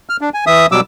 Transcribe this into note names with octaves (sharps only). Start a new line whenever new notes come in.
F6
D4
G#5
E3 E5 D#6
B2 F#3 G3 D6 E6